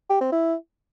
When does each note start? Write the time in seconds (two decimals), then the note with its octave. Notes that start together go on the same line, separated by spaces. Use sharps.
0.10 G4
0.21 C4
0.32 E4